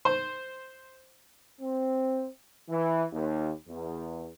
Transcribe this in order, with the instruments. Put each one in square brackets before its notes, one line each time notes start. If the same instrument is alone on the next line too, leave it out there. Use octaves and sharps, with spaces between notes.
[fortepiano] C5
[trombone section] C4
E3
D#2
E2